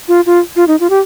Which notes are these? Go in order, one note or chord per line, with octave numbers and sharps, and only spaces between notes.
F4
F4
F4
D#4
F4
G4